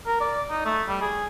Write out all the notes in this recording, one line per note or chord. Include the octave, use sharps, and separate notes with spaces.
A#4
D5
D#4
A3
G3
G#4